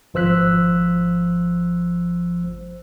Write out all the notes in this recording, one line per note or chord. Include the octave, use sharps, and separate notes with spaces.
G#1 F3 C5 E6 F#6 B6